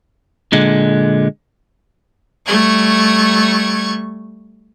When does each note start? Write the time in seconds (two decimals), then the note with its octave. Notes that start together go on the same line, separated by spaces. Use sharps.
0.52 A#2 D3 G#3
2.47 G3 A3 C#6 G#6